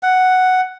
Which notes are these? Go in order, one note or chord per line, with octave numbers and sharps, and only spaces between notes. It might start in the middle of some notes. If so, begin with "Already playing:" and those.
F#5